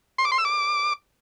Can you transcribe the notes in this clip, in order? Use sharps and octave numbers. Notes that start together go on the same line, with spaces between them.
C6
D6
C6
E6
D6